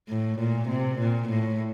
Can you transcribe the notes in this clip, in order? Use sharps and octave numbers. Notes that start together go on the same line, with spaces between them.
A2
A#2
C3
A#2
A2